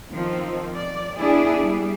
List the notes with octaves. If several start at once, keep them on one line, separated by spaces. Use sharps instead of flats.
D#3 F3 C4
D5
B3 D4 E4 G#4
G3